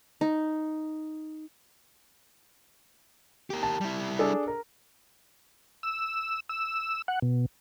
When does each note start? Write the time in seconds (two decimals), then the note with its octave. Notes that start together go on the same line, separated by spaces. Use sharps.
0.21 D#4
3.50 G4 A#4
3.63 A5
3.81 G3 E4
4.19 D4 G#4 A4
4.48 A#4
5.83 E6
6.49 E6
7.08 F#5
7.22 B2